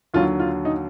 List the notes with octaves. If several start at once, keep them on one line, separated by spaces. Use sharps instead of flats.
D#2 D3 F#3 F4
F4
D#4